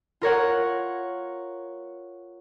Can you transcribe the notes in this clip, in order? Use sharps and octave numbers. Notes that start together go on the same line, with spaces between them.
F4 A#4 C#5 F#5